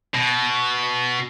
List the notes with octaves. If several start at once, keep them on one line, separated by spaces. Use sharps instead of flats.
B2